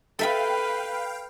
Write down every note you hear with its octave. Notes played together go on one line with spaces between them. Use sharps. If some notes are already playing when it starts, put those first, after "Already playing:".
A4 B4 E5 F5 G5 B5